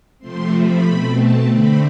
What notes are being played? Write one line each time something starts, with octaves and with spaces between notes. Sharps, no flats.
C3 F3 A3 C4 C6
B5
B2 A3 C4
A5
D3 A3 C4 B5